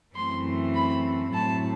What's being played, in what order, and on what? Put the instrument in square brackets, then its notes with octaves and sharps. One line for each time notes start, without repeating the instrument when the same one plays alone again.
[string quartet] F#2 E3 A3 C4 C6
B5
A2 F#3 A3 C4 A5